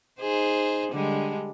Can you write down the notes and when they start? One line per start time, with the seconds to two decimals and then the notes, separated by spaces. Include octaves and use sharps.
0.20 D#4 G#4 C5
0.92 D3 G3 G#3